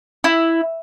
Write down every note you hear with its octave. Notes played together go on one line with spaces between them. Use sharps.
E4